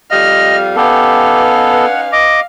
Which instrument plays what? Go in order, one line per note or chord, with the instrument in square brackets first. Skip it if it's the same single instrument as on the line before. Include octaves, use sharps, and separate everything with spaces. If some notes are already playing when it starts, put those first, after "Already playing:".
[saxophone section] F2 G3 F5 [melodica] D#5 [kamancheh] F6
[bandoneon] B3 A4 [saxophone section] C#4 D#4 B4 [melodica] G4 [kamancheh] F5
[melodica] F#5
D#5 D6